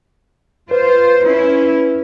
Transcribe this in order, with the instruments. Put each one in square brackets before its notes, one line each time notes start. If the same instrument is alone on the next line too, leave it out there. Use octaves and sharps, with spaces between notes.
[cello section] F4 C5 [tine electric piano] B4
[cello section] C#4 E4